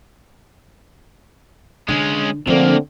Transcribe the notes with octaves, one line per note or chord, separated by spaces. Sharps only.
D3 G#3 C#4
A2 D3 F3 A#3 C4